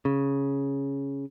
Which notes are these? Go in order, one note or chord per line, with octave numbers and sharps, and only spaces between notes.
C#3